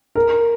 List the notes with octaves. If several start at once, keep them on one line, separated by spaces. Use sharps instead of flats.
A#4